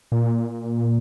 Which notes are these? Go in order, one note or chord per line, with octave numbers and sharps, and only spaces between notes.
A#2